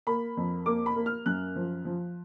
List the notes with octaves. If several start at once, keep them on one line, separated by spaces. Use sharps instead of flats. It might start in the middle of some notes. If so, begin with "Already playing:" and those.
A#3 B5
F2
A#3 D6
B5
A#3
F6
F#2 F#6
F3
F3